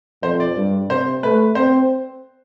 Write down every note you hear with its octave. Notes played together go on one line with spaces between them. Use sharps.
F2 C5
D5
G2
C3 C5
A3 B4
C4 C5